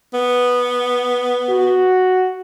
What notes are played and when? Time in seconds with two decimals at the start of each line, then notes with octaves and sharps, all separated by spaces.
0.14 B3
1.49 F#4